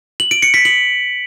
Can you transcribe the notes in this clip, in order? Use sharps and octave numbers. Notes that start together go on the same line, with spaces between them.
F#7
D7
C#7
B6
F#7